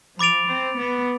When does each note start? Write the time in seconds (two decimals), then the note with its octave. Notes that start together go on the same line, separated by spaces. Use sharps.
0.19 F3 B5 D6 A6 D7 F7
0.48 C4
0.77 B3